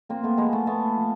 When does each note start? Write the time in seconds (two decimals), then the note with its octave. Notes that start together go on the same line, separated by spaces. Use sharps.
0.09 A#2 A#3 C4
0.23 A3 B3
0.37 F3 G#3 A#3
0.53 A3 B3
0.67 A#2 A3 B3
0.96 F3